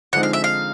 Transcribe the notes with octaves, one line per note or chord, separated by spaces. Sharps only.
D3 F3 G#3 C4 D#4 F#5
F5
E5
F5